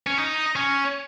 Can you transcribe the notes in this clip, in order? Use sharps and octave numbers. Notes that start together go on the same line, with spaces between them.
C#4
D#4
C#4